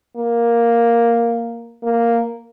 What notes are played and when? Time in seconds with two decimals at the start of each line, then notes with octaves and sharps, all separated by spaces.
0.17 A#3
1.83 A#3